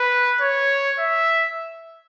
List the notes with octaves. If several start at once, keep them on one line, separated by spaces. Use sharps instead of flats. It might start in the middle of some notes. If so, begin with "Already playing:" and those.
Already playing: B4
C#5
E5